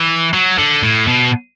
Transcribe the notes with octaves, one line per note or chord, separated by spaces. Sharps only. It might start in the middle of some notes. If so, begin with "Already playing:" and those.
Already playing: E3
F#3
D3
A2
B2